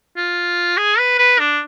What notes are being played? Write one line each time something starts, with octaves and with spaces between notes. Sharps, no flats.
F4
G#4
B4
B4
D4